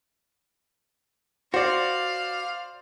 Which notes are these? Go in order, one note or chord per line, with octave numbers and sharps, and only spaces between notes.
F#4 C5 D5 F5